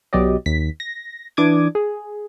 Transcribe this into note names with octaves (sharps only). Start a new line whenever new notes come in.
B1 B2 F#3 G4 D5 D#5
D#2 B6
A#6
E3 D4 D6 D#6 G#6
G#4